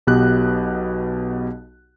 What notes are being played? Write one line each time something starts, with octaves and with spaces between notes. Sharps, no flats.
B1 B2 B3 G4 F#6